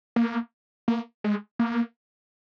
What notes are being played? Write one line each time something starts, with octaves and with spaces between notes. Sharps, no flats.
A#3
A#3
G#3
A#3